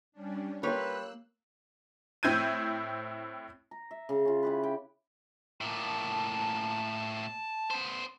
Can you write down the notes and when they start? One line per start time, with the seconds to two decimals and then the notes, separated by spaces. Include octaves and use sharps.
0.12 G3 C#4 D4
0.63 G3 A#3 B4 C#5 C6 E6 F#6
2.23 A2 C4 E4 G6 G#6 D#7
3.71 A#5
3.91 E5
4.09 C#3 A#5
4.25 C#4 F4
4.43 E4 G4 B4
4.63 G5
5.61 A2 A#3 A5
7.71 B3 C5